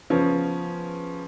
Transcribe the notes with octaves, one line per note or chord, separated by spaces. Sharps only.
C#3 F3 B3 C#4